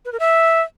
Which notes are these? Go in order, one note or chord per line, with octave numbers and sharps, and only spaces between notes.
B4
A#4
E5